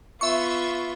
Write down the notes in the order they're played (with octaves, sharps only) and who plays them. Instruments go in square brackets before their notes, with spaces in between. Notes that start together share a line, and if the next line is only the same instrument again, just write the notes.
[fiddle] B3 F4 [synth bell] E5 C#6